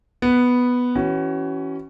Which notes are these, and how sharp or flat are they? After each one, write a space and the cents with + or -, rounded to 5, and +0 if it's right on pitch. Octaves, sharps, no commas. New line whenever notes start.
B3 +0 B4 +0
E3 +0 C#4 +0 F#4 +30